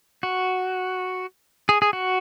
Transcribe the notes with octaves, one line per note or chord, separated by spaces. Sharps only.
F#4
G#4
G#4
F#4